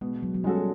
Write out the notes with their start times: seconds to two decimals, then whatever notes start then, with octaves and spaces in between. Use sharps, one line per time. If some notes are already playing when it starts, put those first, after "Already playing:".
0.01 B2 G#3
0.23 F#3
0.34 F#3
0.44 G3 G#3 C#4 F#4 A4